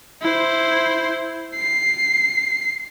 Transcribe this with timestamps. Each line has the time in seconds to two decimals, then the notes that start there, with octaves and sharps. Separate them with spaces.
0.22 E4 C5
1.55 C7